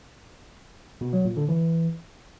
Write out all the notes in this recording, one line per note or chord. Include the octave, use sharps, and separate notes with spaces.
B2
F#3
A#2
D3
E3